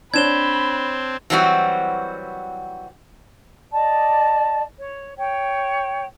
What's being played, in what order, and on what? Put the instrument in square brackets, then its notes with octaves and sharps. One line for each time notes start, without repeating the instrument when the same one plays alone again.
[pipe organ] C4 [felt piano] D4 C#5 [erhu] B5 [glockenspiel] G#6 E7 G7
[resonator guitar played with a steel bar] E3 F#3 G3 C4 F#4
[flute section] D5 D#5 A5
C#5
C#5 G5